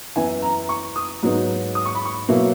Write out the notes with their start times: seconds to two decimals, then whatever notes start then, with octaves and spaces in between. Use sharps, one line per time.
0.16 F#2 E3 B3 E4 G#5
0.42 A#5
0.69 C#6
0.96 D#6
1.23 G#2 F#3 B3 D#4
1.75 D#6
1.86 C#6
1.95 B5
2.05 C#6
2.28 B2 F#3 A#3 E4